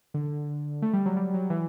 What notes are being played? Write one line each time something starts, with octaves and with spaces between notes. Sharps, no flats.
D3
A3
G3
F#3
G3
F#3
E3